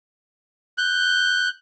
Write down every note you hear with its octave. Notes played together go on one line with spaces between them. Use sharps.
F#6 G6